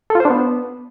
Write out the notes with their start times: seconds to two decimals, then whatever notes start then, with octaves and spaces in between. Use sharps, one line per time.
0.10 A4
0.15 F4
0.20 C5
0.25 D4
0.30 B3